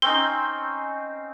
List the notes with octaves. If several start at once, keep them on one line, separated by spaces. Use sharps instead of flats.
C4 C#4 D#4 G7